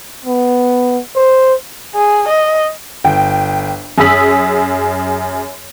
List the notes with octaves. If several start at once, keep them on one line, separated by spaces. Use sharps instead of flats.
B3
C5
G#4
D#5
G1 G5
F#2 G#4 D#6 E6 B6 F#7